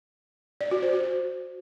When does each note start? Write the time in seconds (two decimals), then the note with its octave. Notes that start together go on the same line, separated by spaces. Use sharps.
0.61 D5
0.71 F#4
0.82 C5
0.93 F#4